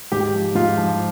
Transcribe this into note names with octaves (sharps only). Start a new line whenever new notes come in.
G#2 G4
F3
G#2 F4
F3